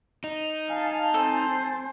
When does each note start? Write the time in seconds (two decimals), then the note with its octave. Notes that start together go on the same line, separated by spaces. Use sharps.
0.24 D#4
0.69 F5 G#5 A5
1.14 C4 A4 C5